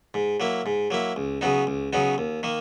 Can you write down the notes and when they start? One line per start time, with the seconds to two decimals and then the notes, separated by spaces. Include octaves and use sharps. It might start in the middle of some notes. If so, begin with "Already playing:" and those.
0.14 G#2
0.40 F#3 A#3 E4
0.66 G#2
0.91 F#3 A#3 E4
1.16 C#2
1.41 C#3 F#3 B3 D#4
1.67 C#2
1.93 C#3 F#3 B3 D#4
2.18 D#2
2.43 D#3 A#3